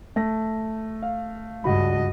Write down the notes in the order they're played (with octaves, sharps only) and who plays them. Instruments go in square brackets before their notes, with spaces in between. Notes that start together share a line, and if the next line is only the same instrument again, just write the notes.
[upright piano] A3 A#6
[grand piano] F5
[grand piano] C#2 F#4 B5 [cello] G2 D#5